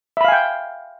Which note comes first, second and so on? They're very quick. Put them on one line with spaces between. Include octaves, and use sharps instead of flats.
E5 B5 F5 G#5 G5